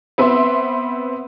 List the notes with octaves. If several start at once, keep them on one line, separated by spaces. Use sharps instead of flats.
B3 C4 E5 C6